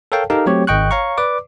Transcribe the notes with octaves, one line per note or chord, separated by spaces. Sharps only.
A4 A#4 C#5 F5 G5 A5
D#4 G4 A4 A#4 F5
F#3 A3 C4 G4 C#5
G#1 D#5 G5 C#6 F#6
C#5 F5 A#5 C#6
B4 D5 D6